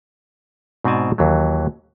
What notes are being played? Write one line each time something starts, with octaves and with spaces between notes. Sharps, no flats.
G#2 B2 C4 D5 G#5 A5
D#2 E3 F#3